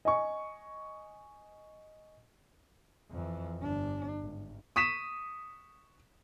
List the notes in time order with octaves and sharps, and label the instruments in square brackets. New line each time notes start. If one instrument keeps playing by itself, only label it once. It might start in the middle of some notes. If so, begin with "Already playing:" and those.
[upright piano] D#5 G#5 C#6
[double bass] F2 E3
G1 D4
G#1
[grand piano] C#6 B6 E7 [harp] D#6